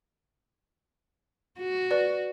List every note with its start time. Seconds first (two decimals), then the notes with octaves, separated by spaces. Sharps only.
1.59 F#4
1.91 B4 D5